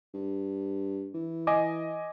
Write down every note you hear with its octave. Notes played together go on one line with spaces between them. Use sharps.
G2
E3
D#5 G#5 D6